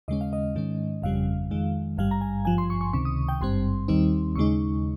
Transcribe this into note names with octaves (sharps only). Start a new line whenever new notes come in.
D#2 C#3 G#3 C#4 D#5
F5
D#5
G#2 D#3 G#3 C#4
G1 F2 C#3 G3 F5
F2 D#3 G#3
G#1 G2 G3 F5
A#5
G#5
G#1 G2 F3 G#5
C6
C#6
C#6
C#2 C3 D#3 C#6
D#6
G5
G#1 G2 G3 C4 C6
D#2 D#3 G3 C4 D#4
D#2 C#3 G#3 D#4 C#6